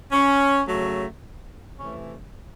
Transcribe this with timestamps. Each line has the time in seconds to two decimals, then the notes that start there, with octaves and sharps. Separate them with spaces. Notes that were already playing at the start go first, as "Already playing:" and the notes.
0.12 C#4
0.67 C#3 F#3 A3
1.77 C3 E3 A3 C#4